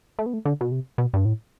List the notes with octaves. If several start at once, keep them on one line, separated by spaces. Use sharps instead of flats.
A3
B3
A3
D3
B2
C3
B2
G2
A2